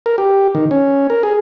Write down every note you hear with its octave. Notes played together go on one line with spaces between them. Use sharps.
A#4
G4
D#3
C#4
A#4
G#4